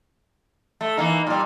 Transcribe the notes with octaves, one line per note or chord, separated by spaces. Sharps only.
A3
E3 A#3 D#4
A#2 G3